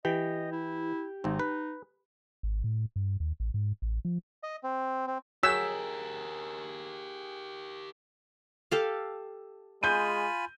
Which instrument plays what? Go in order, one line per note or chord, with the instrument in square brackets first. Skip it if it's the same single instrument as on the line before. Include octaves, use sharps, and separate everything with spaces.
[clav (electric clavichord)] E3 [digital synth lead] G4 [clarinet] D#5
[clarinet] E4
[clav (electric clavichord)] G#1 C4 [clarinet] D#4
[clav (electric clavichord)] B4
[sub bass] G#1
A2
G2
D#2
A1
G#2
A1
F3
[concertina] D#5
C4
C4
[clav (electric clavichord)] F#3 [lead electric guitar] G4 A#4 [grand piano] G#4 G6 B6 [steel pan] E6
[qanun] G4 A4 F5
[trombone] G#3 [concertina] F4 G#5 B5 [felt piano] G6 D#7